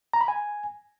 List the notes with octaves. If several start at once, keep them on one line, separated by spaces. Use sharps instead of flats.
A#5
B5
G#5